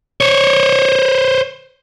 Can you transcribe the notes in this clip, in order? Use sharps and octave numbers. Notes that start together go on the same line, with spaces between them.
C5 C#5